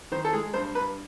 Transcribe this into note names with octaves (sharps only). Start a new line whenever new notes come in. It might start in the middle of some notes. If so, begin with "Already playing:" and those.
D#3 C5
A4
G#3 G#4
G2 C5
G2 B4